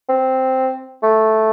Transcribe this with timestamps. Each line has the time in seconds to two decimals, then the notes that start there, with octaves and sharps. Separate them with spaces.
0.09 C4
1.03 A3